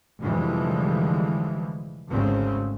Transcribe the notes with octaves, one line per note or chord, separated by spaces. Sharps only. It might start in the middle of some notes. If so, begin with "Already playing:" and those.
F1 D3 E3 F3 G3 G#3
G#1 D2 G#2 C#3 C4